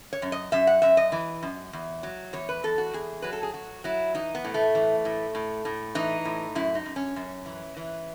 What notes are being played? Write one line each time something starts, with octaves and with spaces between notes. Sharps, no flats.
C#5
F#2
D#5
F#2 E5
F#5
F#2 E5
D#5
E3
F#2
E2
F#3
E2 C#5
B4
E2 A4
F#4
E2 G#4
F#3 B4
A4
G#4
F#3 F#4
F#3 E4
E3 D#4
B3
A2
A3
E3
A2
A2
A2
E3 D#4
A2
F#2 E4
D#4
F#2
C#4
F#2
E3
E3